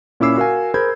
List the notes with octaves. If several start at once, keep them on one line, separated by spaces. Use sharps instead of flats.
A#2 C#4 E4 D6 E6 C7
F#4 A#4 F5 G#5
G#4 A#4 C5 B5 G6 G#6